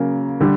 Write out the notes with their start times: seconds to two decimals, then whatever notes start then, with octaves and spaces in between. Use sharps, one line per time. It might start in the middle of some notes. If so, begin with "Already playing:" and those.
Already playing: C#3 F#3 A#3
0.40 D3 G3